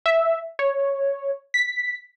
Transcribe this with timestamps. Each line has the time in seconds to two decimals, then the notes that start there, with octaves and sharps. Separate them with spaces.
0.06 E5
0.59 C#5
1.54 B6